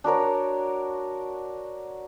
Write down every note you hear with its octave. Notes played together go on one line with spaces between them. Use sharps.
D4 F#4 A#4 C#5